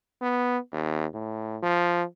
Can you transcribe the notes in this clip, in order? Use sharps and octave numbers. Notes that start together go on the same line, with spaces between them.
B3
D#2
A2
F3